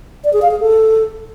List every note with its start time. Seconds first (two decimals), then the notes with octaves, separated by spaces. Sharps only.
0.24 D5
0.33 G#4
0.42 F5
0.51 G#4
0.60 A4